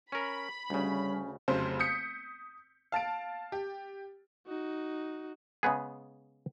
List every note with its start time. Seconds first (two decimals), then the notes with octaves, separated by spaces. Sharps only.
0.12 C#4 A#4 B5
0.70 D2 C#3 G3 C#4
1.48 F1 C#3 F#3 C5
1.79 D#6 G6 B6 C#7
2.92 F5 A5 A6 D7
3.52 G4
4.47 D#4 F#4
5.63 C#3 G#3 B3 G#4